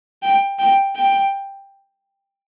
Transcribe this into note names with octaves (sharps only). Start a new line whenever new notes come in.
G5
G5
G5